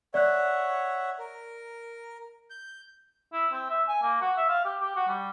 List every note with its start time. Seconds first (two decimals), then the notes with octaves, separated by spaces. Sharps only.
0.14 C#5 D5 E5 F#5 F#6
1.19 A#4
2.50 G6
3.33 E4
3.52 C4
3.69 E5
3.88 G#5
4.03 A#3
4.21 F#4
4.37 E5
4.49 F5
4.65 G4
4.80 G4
4.96 F#4
5.08 G3